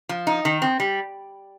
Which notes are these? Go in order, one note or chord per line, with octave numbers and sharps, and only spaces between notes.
F3
D#4
D#3
C4
G3